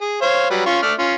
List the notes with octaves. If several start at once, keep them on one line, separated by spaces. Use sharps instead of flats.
G#4
C5 C#5 F5
F#3 G3 B4
C#4 F4 C#6
A3 D5 F6
C#4 F4